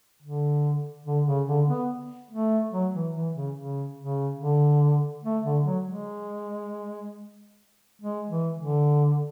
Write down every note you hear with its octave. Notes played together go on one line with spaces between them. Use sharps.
D3
D3
C#3
D3
B3
A3
F#3
E3
E3
C#3
C#3
C#3
D3
A3
D3
F#3
G#3
G#3
E3
D3